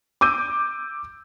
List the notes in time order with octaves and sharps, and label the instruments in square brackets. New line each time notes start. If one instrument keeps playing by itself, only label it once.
[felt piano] D6 E6 G6 D#7